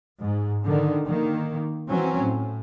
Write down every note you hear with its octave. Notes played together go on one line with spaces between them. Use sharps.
G#2
D3 D#3
D#3 A#3
E3 F#3 C4 C#4
A2